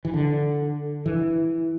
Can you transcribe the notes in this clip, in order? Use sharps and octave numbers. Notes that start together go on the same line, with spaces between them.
E3
D3
E3